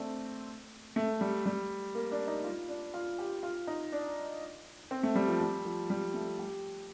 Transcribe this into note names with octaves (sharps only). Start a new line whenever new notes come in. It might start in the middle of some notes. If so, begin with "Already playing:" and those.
Already playing: A3 C4 D4
A3
G3
G3
A#3
D4
D#4
F4
D4
F4
G4
F4
D#4
D4
C4
A3
G3
F3
G3
F3
G3
A3
G4